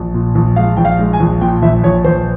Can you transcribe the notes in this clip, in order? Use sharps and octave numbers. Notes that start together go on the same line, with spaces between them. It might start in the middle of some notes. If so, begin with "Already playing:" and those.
Already playing: A#1
A#2
A#1
G#3 F5
A#1 G5
F5
G#3
G#5
A#1
A#2 G5
A#1 E5
A#1 C#5
A#1 C5